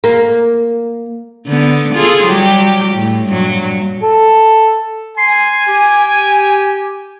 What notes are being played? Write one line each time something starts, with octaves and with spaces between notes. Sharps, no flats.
A#3
D3 B3
F4 G#4 A4
F#3 G3 G4
A2
G2 A#2 F#3
A4
G#5 C6
G4